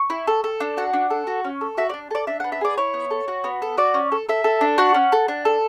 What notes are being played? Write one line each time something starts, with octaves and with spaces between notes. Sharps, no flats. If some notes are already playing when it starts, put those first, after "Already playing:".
Already playing: C#6
E4
A4
A4
D4
F#4 F#5
D4
A4
F#4
C#4
A4
F#4 E5
D5
D4
A4 D5
D4 E5
F#5
B3
E5
G#4 D5
E4 C#5
B3
A4
F#4
B3
A4
F#4 D5
C#4
A4
A4 E5
A4
D4
F#4 F#5
C#4
A4
D4
A4